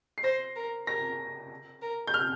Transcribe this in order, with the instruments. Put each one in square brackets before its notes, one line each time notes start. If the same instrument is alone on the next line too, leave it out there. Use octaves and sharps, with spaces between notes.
[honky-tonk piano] C7
[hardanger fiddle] C5 [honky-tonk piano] A#6
[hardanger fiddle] A#4
[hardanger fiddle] A#4 [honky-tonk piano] A#6
[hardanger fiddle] A#4
[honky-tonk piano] G6
F6